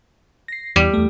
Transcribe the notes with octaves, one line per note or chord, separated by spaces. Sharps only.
A#6 C7
E2 G3
E2 A3